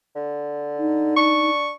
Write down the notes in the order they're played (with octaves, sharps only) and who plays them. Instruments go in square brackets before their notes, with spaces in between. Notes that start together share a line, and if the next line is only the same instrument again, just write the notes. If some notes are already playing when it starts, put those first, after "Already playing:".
[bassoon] D3
[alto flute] D#4
[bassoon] D4 [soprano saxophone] C#6